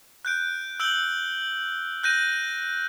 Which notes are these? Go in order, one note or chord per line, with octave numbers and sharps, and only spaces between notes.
F#6 G6 D7
E6 G6 D7 F#7 G7
F#6 G6 A#6 D#7